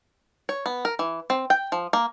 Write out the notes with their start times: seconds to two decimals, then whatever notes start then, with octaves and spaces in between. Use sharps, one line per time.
0.49 C#5
0.66 B3
0.85 A#4
0.99 E3
1.30 C4
1.50 G5
1.72 F3
1.93 A#3